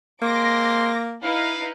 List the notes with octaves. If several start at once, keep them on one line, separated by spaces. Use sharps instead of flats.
G#3 A#3 C4 C6 D6 A#6
D#4 E4 B4 F5